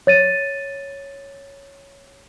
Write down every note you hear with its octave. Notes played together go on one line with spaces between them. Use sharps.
C#5 A6 D#7